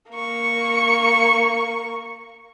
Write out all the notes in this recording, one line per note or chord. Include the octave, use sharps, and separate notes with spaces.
A#3 C#6